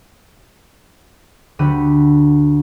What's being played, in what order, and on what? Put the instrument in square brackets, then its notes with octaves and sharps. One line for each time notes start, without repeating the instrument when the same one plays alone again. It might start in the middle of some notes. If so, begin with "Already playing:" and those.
[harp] D2 D3 G4 F#5 B5 D#7